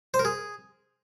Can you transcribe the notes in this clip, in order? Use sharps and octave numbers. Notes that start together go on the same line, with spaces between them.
C5
A#4
G#4